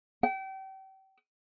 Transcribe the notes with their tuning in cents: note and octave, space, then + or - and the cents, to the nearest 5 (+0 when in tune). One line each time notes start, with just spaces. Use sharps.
G5 -35